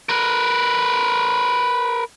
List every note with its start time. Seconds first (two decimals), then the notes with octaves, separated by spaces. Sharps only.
0.09 A#4 B4